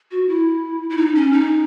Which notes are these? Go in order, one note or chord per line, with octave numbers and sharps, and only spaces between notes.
F#4
E4
E4
D#4
C#4
D#4